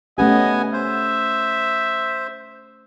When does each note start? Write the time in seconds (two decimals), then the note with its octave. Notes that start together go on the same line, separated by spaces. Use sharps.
0.18 A3 B3 C#4 G4 D#5 G#5
0.73 C5 E5